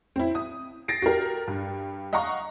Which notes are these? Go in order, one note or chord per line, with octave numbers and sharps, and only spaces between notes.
C4 E4
D#6
A6 A#6 C7 D7
F#4 G4 A#4
G2
D#5 F5 F#5 A#5 C#6